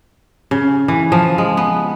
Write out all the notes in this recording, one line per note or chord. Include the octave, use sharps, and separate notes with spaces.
C#3
E3
F3
G#3
B3